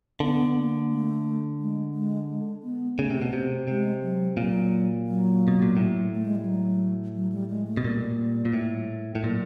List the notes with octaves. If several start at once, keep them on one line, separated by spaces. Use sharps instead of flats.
D3 B3
A#3
A3
G#3
G#3
G#3
B3
C#3 A3
C3
B2
C3
C3 G#3
F#3
A#2 F#3
F#3
B2
A#2
A2
A3
G#3
G3
F#3
F#3
G3
G#3
A3
B2
A#2 G3
A#2
A2
A2
A#2 F#3